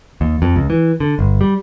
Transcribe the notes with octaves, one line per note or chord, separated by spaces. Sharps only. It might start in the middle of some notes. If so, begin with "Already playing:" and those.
D#2
F2
C#2
E3
D3
G1
G3